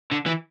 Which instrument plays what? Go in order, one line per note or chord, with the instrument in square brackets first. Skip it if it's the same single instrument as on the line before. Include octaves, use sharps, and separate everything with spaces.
[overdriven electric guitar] D3
E3